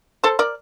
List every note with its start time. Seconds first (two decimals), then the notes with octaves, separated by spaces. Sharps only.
0.24 A4 C5
0.39 A#4 D5